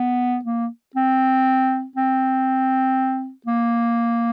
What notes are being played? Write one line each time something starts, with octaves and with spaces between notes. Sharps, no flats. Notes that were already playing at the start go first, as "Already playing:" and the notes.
Already playing: B3
A#3
C4
C4
A#3